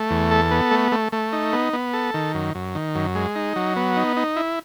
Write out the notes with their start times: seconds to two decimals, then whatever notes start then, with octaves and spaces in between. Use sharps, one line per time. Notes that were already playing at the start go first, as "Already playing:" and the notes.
Already playing: A3
0.11 E2
0.31 A4
0.51 B3
0.71 A3
0.92 A3
1.12 A3
1.33 D#4
1.53 B3
1.73 B3
1.93 A4
2.14 D#3
2.34 F#2
2.55 F#2
2.75 D#3
2.95 F#2
3.15 G#3
3.36 D#4
3.56 F#3
3.76 B3
3.96 D#4
4.17 D#4
4.36 E4